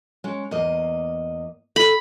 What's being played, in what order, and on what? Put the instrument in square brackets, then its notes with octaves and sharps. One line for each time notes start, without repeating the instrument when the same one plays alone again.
[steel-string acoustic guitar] G#3 C#4
E2 A#3 D#5
[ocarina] A4 [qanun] B5